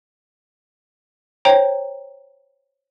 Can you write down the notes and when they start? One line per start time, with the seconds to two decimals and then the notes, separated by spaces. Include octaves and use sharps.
1.45 C5 C#5 G5 A#5